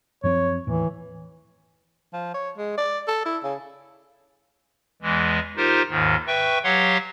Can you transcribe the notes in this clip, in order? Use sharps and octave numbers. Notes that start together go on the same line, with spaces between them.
F#2 F3 C4 C#5
D#2 A2 E3
F3
C#5
G#3
D5
A4
E4
C#3
E2 E3 G#3
D#4 F4 G4 A#4 C5
D#2 G#2 D#3
B4 E5 G5 C#6
F#3 G4 C#5 F5 F#5 C6